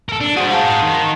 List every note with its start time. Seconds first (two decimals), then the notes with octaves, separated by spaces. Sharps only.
0.09 A4 A#4
0.21 D4
0.36 F#4 G#4 C5 F#5 D#6
0.51 F5 F#5 A5
0.82 D#3